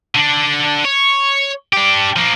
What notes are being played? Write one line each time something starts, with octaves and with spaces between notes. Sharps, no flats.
D3 D4
C#5
D4 G4
F3 A#3